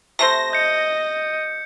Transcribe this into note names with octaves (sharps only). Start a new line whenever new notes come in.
C3 A3 C5 A#6
D#5 G6 C#7